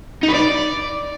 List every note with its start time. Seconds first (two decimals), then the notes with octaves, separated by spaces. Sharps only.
0.23 D#4
0.28 B4
0.34 D5